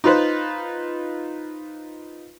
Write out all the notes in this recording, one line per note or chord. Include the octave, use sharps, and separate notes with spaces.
D#4 F4 B4 C5